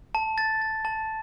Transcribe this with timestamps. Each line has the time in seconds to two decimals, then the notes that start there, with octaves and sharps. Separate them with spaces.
0.15 A5
0.38 A6
0.62 A6
0.85 A5